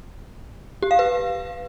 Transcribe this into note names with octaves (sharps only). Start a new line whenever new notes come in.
G4
F5
B4